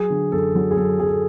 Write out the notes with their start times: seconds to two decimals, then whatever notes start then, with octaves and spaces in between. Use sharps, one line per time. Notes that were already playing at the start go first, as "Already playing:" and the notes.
Already playing: F#3 G#4
0.10 D3
0.32 F#2 A4
0.55 F#3
0.71 G#4
0.77 F#2 A4
1.00 F#2 G#4
1.07 A4